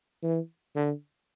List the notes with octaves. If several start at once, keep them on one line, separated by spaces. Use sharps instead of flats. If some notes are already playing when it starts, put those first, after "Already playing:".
E3
D3